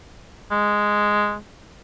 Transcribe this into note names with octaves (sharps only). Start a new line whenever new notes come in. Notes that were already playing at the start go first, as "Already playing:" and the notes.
G#3